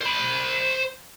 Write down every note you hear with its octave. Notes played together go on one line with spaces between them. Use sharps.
C5 B5